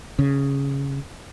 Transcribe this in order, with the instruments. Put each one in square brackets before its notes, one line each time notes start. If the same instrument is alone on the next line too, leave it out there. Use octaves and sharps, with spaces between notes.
[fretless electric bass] C#3